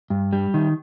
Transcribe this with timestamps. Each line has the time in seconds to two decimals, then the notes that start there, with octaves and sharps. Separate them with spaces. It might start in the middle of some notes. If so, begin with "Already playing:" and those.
0.10 G2
0.33 G3
0.54 D#3